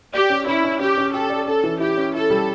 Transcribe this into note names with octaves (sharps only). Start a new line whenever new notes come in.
G4 D5
C#4
C#4 E4
C#4
C#4 G4
C#4
G4 A4
D5
C#4 A4
E3
E4 G4
C#4
E4 A4
G3